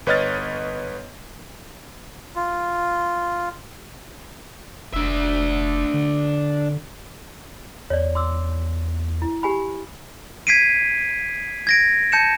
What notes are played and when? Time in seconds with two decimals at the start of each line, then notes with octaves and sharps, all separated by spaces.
0.06 G1 B4 C#5 D#5 F6 A6
2.36 F4
4.94 F1 D4 E5
5.94 D3
7.90 E2 C#5 D5
8.15 C6 D6 E6
9.22 E4
9.43 G4 G#5 B5
10.47 G#6 B6 C7 D7 D#7
11.67 G#6 A#6 D7
12.12 A5 G6 C#7 E7